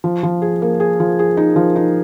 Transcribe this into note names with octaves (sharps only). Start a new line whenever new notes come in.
F3
F3
G#4
A#3
G#4
F3
G#4
D#4
F3
D#4